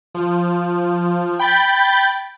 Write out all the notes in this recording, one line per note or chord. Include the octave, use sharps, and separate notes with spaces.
F3
G5 B5 G6 A6